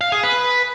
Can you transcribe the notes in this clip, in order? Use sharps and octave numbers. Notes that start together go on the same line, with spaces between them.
F5
G#4
B4